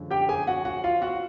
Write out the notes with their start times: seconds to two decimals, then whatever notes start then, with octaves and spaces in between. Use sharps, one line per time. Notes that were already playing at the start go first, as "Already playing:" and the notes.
Already playing: F#2 D3 F3 G#3
0.11 G4 G5
0.29 G#4 G#5
0.47 F#4 F#5
0.65 F#4 F#5
0.84 F4 F5
1.02 F#4 F#5